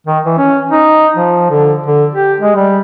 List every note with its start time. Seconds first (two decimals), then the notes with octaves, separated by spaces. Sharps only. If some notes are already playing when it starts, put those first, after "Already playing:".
0.07 D#3
0.25 E3
0.38 C#4
0.71 D#4
1.16 F3
1.50 D3
1.86 D3
2.15 G4
2.40 G#3
2.56 G3